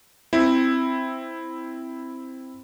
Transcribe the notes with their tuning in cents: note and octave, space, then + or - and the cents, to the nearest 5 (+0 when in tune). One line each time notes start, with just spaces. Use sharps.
C4 +0 E4 +0